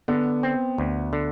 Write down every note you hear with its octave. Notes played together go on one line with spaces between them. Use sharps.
D3 B3
C4
D2
D3